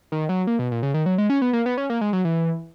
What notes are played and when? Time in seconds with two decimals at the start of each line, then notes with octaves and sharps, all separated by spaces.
0.12 D#3
0.29 F#3
0.47 A#3
0.59 B2
0.71 A#2
0.83 C#3
0.94 D#3
1.06 F#3
1.18 G#3
1.30 C#4
1.42 B3
1.53 A#3
1.66 B3
1.78 C#4
1.90 A#3
2.01 G#3
2.13 F#3
2.25 E3